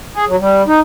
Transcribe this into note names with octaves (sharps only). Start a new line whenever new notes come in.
G#4
F#3
G3
D#4